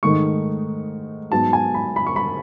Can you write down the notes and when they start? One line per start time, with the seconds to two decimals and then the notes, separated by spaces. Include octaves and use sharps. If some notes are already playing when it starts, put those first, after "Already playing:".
0.03 G#2 D#3 A3 D#4 C#6
1.31 G#2 F#3 B3 A5
1.53 G#5
1.74 B5
1.96 B5
2.07 C#6
2.16 B5